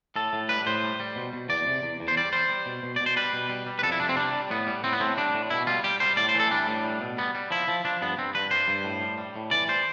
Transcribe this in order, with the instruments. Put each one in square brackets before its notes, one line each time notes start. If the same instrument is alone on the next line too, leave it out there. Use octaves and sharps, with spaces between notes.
[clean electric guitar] A2 A4
A2
G3 B4
A2 C5
G3
G3
B2
B2
E2 D5
C3
E2
E2
C5
G3 D5
G3 C5
G3
B2
B2
B2 D5
C5
G3 B4
B2
G3
G3
B4
F2 A4
E4
C3 D4
C4
G3 D4
G3
A2 B3
G3
A2 C4
B3
A2 C4
G3 D4
A2
B2 E4
G3 F4
G3 G4
G3 C5
A2 D5
C5
E3 A4
G3 D4
A2
G3
B2
G3 B3
G3
F3 E4
F3
F3 D4
G2 B3
G2 C4
G2 B4
G3 C5
G2
A2
G3
G3
A2
E3 D5
G3 C5